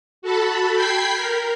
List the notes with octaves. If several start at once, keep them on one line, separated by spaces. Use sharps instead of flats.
F#4 A4 A5 B5
G5 B5 G6 G#6 B6 C7
A#4